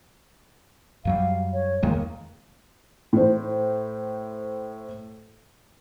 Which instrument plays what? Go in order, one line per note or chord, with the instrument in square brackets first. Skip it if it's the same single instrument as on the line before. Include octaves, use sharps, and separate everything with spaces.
[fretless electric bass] F#2 F#3 G3 [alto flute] F5
[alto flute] C#5
[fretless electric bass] E2 D#3 G#3 [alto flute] A#3
[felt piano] A2 C5